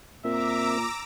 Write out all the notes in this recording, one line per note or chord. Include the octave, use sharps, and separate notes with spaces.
A#2 C4 A#4 E5 A#5 D6 E6